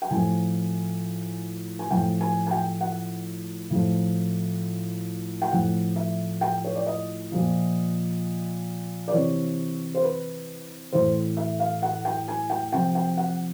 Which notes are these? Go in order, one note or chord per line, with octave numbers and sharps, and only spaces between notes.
G5
A2 F3 G#5
G#5
A2 F3 G5
G#5
G#5
G5
F#5
A2 F3
G5
A2 F3 F#5
E5
G5
C#5
D5
D#5
A#2 F3
D5
C3 E3 C#5
C5
B4
A2 E3 C5
E5
F5
F#5
G5
G#5
G5
C3 F3 G5
G5
F#5